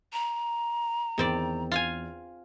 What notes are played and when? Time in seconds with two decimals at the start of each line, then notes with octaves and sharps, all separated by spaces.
0.13 A#5
1.18 E2 D#3 C4 D5
1.71 F4 F5 G#5